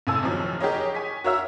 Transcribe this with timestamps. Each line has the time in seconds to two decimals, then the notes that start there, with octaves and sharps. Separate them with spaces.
0.07 A#1 A2 C#3 G#5 A5 E6
0.23 F#1 D#2 F3 F#3
0.60 G4 G#4 A#4 C#5 D#5
0.94 G#5 C#6 B6
1.24 F#4 A#4 C#5 E5 E6 F6